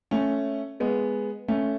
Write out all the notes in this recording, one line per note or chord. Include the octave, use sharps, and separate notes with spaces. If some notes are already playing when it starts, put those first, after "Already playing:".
A3 C#4
G#3 B3
A3 C#4